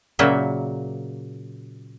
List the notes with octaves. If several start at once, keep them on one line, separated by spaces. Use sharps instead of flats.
A#2 C#3 F#3 A#3 E5